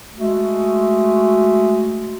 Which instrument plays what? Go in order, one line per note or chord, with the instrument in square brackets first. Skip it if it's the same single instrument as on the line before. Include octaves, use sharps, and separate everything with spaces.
[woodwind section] G#3 A3 F#4